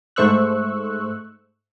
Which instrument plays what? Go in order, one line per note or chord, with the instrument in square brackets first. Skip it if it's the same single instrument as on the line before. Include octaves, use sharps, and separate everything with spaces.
[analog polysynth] G#2 A3 C5 C#6 E6 F#6